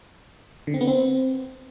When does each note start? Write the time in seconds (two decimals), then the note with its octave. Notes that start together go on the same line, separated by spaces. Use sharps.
0.67 D3
0.74 C4
0.81 B3
0.87 C4